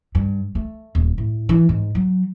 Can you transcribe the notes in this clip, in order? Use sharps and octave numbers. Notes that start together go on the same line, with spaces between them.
G2
A3
D#1
A2
E3
G#2
F#3